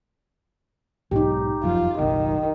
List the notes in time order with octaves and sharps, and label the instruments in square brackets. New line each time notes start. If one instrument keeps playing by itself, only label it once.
[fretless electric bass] B1 G#2 F#3 [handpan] D#4 G4
[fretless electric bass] F1 F#2 F3 [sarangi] F4
[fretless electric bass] F#1 B1 [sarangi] D#3